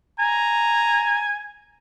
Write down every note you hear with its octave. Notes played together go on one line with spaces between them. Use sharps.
G#5 A#5